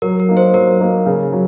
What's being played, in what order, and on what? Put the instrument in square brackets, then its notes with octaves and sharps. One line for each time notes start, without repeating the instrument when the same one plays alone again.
[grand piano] F#3 [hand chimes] A#4
[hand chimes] A#4
[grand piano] A#3 D#4
[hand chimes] C5
[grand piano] F#3 [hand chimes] A#4
[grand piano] A#3 D#4
C#3
F#3